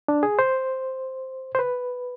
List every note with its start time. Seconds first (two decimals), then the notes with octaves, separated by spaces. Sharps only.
0.08 D4
0.23 G#4
0.39 C5
1.55 C5
1.59 B4